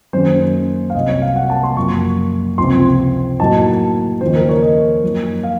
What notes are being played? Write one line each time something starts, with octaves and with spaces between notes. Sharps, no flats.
F#2 D#3 A#3 C#4 C5
F5
C2 C3 F#3 D#5
C#5
F5
F#5
A5
C6
F#1 F#2 F3 A#3 C#6
C#2 C3 F3 C4 C6
A2 F#3 A#3 D#4 A5
D#2 C#3 F3 A#3 D#4 C5
A#4
C#5
D#5
F#2 F3 A#3 D#4
F5